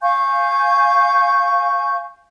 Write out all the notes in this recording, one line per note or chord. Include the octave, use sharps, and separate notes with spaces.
F5 G#5 C#6 G6